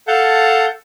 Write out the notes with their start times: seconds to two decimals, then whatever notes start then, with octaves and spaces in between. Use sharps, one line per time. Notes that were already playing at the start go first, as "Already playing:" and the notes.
0.08 A4 F5 F#5 A5 G6